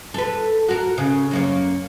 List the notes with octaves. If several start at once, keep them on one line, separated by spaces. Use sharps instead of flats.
A4 B4
F#4 A#4
C#3
F#2 A#3 C#5